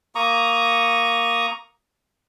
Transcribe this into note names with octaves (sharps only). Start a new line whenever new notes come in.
A#3 A#5 C#6 D#6